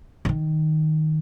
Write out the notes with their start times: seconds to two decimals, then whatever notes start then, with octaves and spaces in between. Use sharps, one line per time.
0.25 D3
0.29 D#3